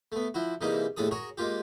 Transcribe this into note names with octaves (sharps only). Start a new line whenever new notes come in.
A3 B3
F3 E4 F#4
C3 E3 G3 A#3 D#4 G#4
D#2 A2 D4 G#4 A4 D#6
F#4 G#4 A#4 C#5
G#3 A#3 F4 G4